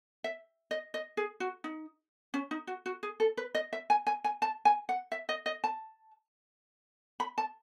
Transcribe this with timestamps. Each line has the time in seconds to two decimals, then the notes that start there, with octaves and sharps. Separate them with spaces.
0.24 E5
0.71 D#5
0.94 D#5
1.17 G#4
1.40 F#4
1.64 D#4
2.34 C#4
2.51 D#4
2.67 F#4
2.86 F#4
3.03 G#4
3.20 A4
3.37 B4
3.55 D#5
3.73 E5
3.90 G#5
4.07 G#5
4.24 G#5
4.42 A5
4.65 G#5
4.89 F#5
5.12 E5
5.29 D#5
5.46 D#5
5.64 A5
7.20 B5
7.38 A5